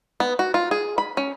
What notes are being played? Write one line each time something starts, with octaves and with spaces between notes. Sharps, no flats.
B3
F#4
F4
G#4
B5
C#4